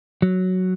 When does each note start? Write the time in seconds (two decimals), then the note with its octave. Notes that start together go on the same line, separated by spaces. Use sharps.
0.22 F#3